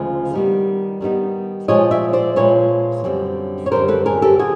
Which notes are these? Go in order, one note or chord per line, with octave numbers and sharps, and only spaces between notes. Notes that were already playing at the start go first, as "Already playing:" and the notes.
Already playing: D2 C#3 F3 G#3
D#3 G3 B3 D#4
D#3 G3 B3 D#4
A#2 F3 G#3 C#5 D#5
D5 E5
C5 D5
A#2 F3 G#3 B4 C#5
F#2 D3 G3 C4
C#5
F#2 D3 G3 C4 A#4 C5
A4 B4
G#4 A#4
G4 A4
D3 F#4 G#4